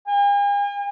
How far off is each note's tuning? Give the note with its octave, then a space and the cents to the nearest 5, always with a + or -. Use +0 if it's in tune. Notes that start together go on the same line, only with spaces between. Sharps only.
G#5 -45